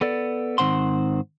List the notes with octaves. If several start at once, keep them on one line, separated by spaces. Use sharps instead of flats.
B3 A4 D5
G#2 D#3 C4 C5 F#5 C6